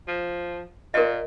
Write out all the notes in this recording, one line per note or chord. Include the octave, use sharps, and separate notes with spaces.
F3
A#2 A#4 D#5